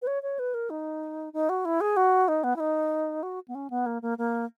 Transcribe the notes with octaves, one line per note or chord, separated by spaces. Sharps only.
B4
C#5
C#5
B4
A#4
D#4
D#4
F#4
E4
G#4
F#4
D#4
B3
E4
D#4
F#4
B3
C#4
B3
A#3
A#3
A#3